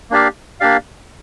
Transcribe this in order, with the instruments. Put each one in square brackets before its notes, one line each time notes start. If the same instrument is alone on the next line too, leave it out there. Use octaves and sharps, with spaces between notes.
[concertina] A#3 D4 G4 D5 F5
A#3 D4 G4 D5 F5